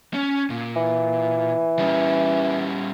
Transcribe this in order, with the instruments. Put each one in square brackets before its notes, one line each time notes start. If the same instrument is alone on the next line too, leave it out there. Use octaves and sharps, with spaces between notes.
[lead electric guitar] C#4
A#2
[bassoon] E3
[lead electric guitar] G3 C#4